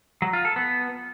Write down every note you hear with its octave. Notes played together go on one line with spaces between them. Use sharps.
F#3
F4
A4
B3